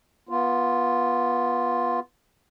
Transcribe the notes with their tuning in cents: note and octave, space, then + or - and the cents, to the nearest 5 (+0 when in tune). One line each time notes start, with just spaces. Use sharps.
B3 -20 F4 +0